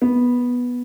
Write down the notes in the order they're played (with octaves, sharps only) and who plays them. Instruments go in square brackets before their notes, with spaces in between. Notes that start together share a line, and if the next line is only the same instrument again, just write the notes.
[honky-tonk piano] B3